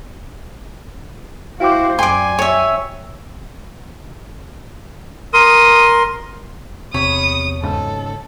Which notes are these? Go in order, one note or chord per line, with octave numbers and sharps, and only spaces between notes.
E4 F#4 C5 F5 G5 D6
F#2 D5 G5 G#5 C6
C#5 E5
A#4 C6 D#6
E2 C3 C#5 B5 D#6
G#1 G#2 C#3 A4